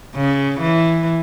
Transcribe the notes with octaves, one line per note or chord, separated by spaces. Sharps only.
C#3
E3